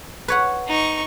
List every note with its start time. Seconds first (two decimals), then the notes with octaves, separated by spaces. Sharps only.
0.28 B4 C#5 F#5
0.68 D#4 C#6